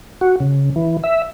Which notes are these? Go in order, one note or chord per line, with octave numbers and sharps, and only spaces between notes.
F#4
C#3
E3
E5